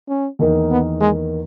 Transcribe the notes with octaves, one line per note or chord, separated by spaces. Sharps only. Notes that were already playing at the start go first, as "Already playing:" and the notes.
C#4
E2 D#3 A#3 D#4
B3
G#3